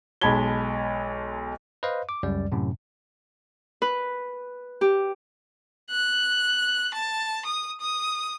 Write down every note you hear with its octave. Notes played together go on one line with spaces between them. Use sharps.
B1 G#3 A5 B5 G#6 G7
B4 C5 D#5 F5
D6
C#2 F#2 G3 D5
F#2 A2 C3
B4
G4
F#6
A5
D#6
D#6